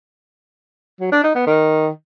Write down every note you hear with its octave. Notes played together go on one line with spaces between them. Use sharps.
F#3
D4
D#4
B3
D#3